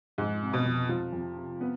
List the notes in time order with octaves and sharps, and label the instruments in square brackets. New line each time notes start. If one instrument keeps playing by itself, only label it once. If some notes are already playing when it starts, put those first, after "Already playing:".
[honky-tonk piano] F2 [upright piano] G#2
[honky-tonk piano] C3
[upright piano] B2
[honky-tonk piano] F2
[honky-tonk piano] F2 [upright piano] F3
[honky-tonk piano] F2
C3
B3